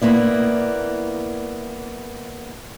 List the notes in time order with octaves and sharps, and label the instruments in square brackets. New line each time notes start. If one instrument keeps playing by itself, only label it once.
[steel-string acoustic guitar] A#3 B3 E4 D5